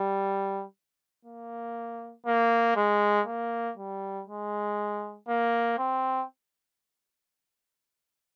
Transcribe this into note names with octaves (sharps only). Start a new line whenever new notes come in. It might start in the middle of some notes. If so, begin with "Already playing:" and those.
Already playing: G3
A#3
A#3
G#3
A#3
G3
G#3
A#3
C4